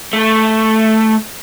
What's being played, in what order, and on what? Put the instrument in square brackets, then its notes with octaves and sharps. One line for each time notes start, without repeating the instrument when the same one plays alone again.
[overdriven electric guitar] A3